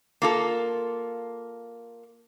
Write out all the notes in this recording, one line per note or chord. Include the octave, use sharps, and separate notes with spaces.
A#3 F4 A4